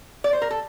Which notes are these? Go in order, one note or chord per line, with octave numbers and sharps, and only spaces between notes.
D5
C5
A#4
A4